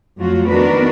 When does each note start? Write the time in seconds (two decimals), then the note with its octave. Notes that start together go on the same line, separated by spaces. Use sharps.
0.18 F2 F#3 A3 F4 F#4
0.48 D#3 B3 D4 F#4 A#4 B4